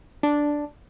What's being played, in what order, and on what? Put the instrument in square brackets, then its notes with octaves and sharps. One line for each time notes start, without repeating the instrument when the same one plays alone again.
[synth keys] D4